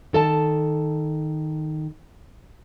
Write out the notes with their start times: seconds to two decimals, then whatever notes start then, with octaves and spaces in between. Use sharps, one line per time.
0.13 D#3 A4 E5 A5